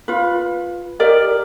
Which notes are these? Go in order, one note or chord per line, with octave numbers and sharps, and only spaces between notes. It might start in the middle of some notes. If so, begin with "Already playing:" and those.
F4 B4
G4 A#4 D5 D#5